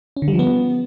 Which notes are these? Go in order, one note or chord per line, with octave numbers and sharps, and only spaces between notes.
C#4
D3
G3
F3
B3